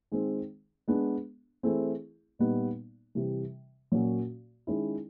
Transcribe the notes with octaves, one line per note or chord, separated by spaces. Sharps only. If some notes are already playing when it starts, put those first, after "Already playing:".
D#3 G#3 C4
G#3 B3 D4
E3 A3 C4 E4 G#4
A#2 G3 B3 D#4
C3 E3 G3
A#2 F#3 A#3 C#4 F#4
D#3 G#3 C#4 E4